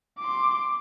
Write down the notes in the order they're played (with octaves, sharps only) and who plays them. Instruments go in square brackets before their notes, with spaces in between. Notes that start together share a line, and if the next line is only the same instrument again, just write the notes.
[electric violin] C6 D6